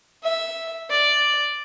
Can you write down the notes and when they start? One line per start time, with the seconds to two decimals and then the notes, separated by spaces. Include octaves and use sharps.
0.23 E5
0.89 D5